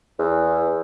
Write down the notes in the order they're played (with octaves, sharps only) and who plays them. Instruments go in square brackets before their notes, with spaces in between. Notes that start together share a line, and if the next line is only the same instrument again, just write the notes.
[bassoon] E2